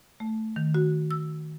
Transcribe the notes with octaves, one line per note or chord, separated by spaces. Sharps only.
A3
D#3
F#4
E6